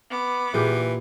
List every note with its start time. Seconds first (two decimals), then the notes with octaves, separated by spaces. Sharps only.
0.10 B3 D6
0.54 A#2 E3 G4 G#4